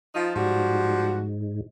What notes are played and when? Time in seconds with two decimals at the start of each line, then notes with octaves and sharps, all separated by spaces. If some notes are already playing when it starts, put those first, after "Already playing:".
0.15 F3 D#4 F4
0.36 G#2 F3 G3 F#4